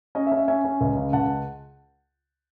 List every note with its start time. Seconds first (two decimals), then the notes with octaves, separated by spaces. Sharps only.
0.15 C#4 D#5
0.26 E5
0.32 C#4
0.37 E5
0.48 C#4 E5 G#5
0.64 C#4
0.81 C#2
0.97 C#3
1.13 C#2 F#5 A5